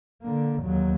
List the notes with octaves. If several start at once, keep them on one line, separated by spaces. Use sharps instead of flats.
D3 A#3
D#2 F#3